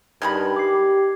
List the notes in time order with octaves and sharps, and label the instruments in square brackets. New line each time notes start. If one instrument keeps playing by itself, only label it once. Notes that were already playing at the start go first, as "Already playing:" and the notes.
[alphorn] G2 [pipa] D#3 G#3 B5 [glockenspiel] G#6
[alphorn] G4 [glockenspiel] D6 C7